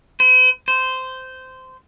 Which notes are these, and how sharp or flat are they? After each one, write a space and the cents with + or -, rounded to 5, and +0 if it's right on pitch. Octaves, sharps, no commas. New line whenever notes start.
C5 -45
C5 -15